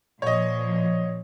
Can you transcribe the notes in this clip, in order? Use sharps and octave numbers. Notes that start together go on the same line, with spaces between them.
A#2 F3 C#5 D#5